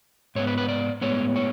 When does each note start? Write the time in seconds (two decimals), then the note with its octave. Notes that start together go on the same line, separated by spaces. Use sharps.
0.35 G#2 G#3 B3 C#5
0.47 B4
0.58 B4
0.68 D5
1.01 A2 G#3 B3 C#5
1.36 C#5